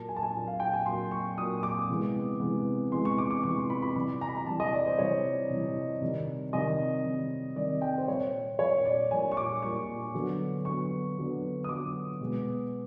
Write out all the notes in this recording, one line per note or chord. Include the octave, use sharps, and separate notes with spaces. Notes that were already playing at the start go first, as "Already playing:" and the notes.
Already playing: A#2 F#3 A#3 A5
G#5
A5
G#5
A#2 F#3 A#3
F5
G5
G#5
A#2 F#3 A#3 C6
C#6
A#2 F#3 A#3 D#6
D6
C3 E3 G#3 B3
C3 E3 G#3 B3
C3 E3 G#3 B3 C6
C#6
D6
D6
C3 E3 G#3 B3 C#6
C6
B5
B5
C3 E3 G3 B5
A#5
B5
A#5
C3 E3 G3 A5
D#5
D5
C5
C3 E3 G3 C#5
C3 E3 G3
C3 D#3 G3
C3 D#3 G3 D#5
C3 D#3 G3
C3 D#3 G3 D5
G5
C5
A#2 G3 A#3 C#5
A#2 G3 A#3 C#5
D5
A#2 G3 A#3 G#5
C#6
D6
A#2 G3 A#3 C#6
D3 F#3 B3
D3 F#3 B3 C#6
D3 F#3 B3
D#6
D3 F#3 B3 D6
B2 G#3 B3